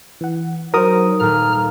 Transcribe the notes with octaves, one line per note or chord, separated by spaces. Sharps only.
E3 F#5
F#3 D#4 F#4 A#4 C5 D#6
D#1 A#2 A4 A#5 F6